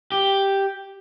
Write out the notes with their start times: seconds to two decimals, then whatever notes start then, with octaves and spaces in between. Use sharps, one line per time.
0.12 G4